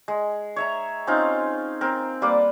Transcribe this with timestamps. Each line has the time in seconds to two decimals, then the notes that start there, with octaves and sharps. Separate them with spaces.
0.08 G#3
0.56 C#5 E5 A#5
1.07 C4 C#4 D#4 F4
1.81 C4 A#4
2.22 G3 A#3 B4 D5